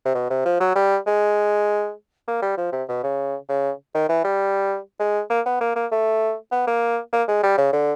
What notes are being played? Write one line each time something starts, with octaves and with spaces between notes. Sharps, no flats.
C3
B2
C3
F3
F#3
G3
G#3
A#3
G3
F3
C3
B2
C#3
C#3
D#3
E3
G3
G#3
A#3
B3
A#3
A#3
A3
B3
A#3
A#3
G#3
G3
C#3
D3